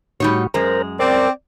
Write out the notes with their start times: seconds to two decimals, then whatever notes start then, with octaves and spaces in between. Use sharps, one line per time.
0.20 A2 G3 D#4 F#4 C#5
0.54 F#2 G#3 A#4 C5 A#5
0.99 C4 A#4 D5